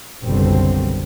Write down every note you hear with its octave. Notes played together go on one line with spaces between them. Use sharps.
F#1 B1 B2 D3 G3 C4